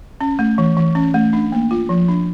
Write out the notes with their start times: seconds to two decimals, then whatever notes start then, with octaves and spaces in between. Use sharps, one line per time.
0.21 C#4
0.39 A3
0.58 E3
0.77 E3
0.95 C#4
1.14 A3
1.33 D4
1.52 A#3
1.71 F4
1.89 F3
2.08 D4